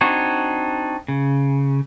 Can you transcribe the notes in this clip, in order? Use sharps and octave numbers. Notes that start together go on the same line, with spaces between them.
C4 D4 D#4 F#4 C#5
C#3